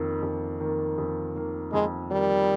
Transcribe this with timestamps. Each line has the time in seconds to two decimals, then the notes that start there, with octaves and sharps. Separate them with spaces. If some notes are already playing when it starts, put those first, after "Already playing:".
Already playing: F2 D#3 A#3
0.23 F2
0.60 D#3 A#3
0.98 F2
1.35 D#3 A#3
1.72 F2 G#3
2.10 D#3 G3 A#3